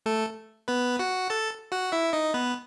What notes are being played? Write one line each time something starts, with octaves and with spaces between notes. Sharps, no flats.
A3 A4
B3 B4
F#4 F#5
A4 A5
F#4 F#5
E4 E5
D#4 D#5
B3 B4